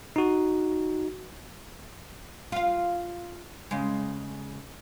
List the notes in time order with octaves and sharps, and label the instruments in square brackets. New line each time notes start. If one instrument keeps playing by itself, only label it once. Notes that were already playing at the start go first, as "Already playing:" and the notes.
[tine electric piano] D#4 F#4
[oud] F4 F5
C#3 G#3